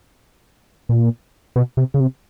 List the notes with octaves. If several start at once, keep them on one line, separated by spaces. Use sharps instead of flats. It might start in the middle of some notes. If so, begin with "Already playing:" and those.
A#2
B2
C3
C#3
C3